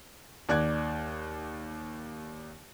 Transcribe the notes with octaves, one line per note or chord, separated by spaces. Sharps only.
D#2 D5 F#6 G#6